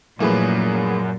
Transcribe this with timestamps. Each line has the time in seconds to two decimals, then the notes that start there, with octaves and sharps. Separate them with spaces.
0.20 F#2 A#2 F3 A3 A#3 E4 G#4 B4